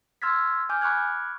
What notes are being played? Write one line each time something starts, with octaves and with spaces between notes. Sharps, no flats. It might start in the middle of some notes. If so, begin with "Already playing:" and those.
C6 E6 F6 G#6 A6 B6
G#5 D6 F6 G6
B5 C#6 D6 F6 F#6 G#6